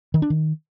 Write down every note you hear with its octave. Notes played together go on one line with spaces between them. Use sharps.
D#3
D4
D#3